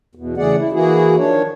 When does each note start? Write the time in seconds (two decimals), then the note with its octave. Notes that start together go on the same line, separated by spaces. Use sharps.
0.15 E2 B2
0.37 C#3 E3 A3 G#4 D5 F#5
0.59 E4
0.73 E3 A#3 E4 F#4 G#4
1.18 D#3 F3 D4 C#5